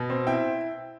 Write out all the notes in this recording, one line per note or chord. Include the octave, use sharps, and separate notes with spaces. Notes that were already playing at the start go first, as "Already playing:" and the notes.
Already playing: B2
C4
E4 G5